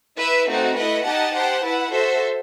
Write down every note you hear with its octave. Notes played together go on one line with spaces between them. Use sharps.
E4 B4 E5
A3 C4 D#4 F#4
A3 E4 B4 D#5 F#5
D#4 G4 D#5 F#5 A5
G4 C5 F#5 A5
E4 B4 F#5
F#4 A4 C5 E5